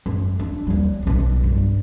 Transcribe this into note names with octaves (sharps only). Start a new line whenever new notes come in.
F#2
D4
D#2 G3
B1 C#4
G2